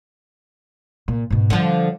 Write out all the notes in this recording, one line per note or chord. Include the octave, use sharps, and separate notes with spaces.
A#2
G#2 B2
D3 F3 G3